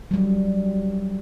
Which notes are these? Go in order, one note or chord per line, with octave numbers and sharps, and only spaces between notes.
F#3 G3